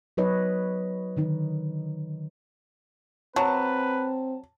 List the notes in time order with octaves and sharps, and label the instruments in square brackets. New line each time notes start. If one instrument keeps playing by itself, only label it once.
[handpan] F#3 D#4 B4 C#5 D#5
D3 D#3 D#4
[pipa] F#3 [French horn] C4 [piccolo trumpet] B4 [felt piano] A5